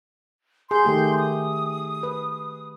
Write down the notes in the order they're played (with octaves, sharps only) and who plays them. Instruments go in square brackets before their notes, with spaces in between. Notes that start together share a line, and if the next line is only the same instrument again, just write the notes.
[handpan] G#4 [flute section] C6 G6
[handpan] D#3 A3 G4
[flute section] D#6
[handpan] B4